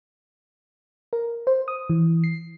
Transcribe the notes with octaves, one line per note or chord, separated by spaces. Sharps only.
A#4
C5
D#6
E3
C7